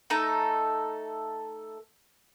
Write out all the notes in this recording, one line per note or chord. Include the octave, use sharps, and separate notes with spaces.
A3 D#4 A4 A#5